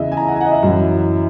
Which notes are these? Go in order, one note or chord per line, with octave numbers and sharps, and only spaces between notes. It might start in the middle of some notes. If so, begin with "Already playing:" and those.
Already playing: E2 C#3 E3 D#5 E5
G#5
A#5
F#5
G#5
F#5
D#5
E5
F#2 E3